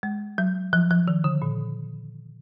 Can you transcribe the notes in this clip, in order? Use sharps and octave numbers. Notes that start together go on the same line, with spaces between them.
G#3
F#3
F3
F3
D#3
D3
A#2